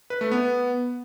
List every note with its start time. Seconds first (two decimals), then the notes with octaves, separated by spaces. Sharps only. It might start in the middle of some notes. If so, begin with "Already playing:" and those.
0.10 B4
0.21 A3
0.31 B3